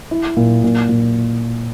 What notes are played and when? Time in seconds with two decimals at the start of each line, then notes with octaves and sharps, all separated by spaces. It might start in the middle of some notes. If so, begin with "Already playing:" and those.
0.11 E4
0.37 A#2
0.64 A#2
0.89 A#2